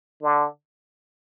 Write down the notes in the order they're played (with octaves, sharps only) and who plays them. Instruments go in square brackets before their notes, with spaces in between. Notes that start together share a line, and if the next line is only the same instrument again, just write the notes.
[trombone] D3